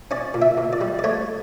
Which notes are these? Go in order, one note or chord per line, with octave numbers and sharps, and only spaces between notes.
C#4 D5
A#2
E5
A#2
D5
G3
D5
A3 C#5